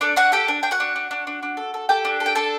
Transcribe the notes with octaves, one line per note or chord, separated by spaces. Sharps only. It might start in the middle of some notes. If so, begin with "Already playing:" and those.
D4 A4 D5
D4 F#4 F#5
G4 A4 G5
D4
D4 G5
F#4 F#5
D4
D4
D4
D4
D4
A4
A4
G4 A4 G5
D4
A4
G5
D4 A4 A5